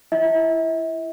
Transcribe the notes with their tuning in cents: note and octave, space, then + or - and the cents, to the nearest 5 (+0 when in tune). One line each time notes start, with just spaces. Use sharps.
E4 +20 E5 -40